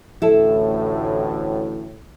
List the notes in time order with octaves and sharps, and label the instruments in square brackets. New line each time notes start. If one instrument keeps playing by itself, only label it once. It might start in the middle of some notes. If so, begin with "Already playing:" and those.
[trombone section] A1 D2 A2 [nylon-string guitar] E4 A4